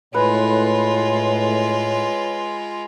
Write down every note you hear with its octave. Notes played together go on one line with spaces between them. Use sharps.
A2 G#3 F4 B4 C#5